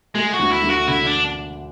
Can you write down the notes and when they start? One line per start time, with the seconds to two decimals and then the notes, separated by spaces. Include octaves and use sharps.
0.15 G#3 A3
0.33 F#4
0.39 D2
0.52 E4
0.63 D2
0.70 F#4
0.88 D3 E4
1.06 D4